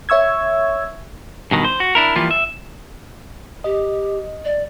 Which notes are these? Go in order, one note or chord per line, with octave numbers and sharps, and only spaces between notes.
C#5 E5 C#6 E6 G#6
G2 B2 D#3 F#3
C5
F#4
D4 E4 A#4
E3 F3 G3 A#3 F4
E5
G4 D#5
D5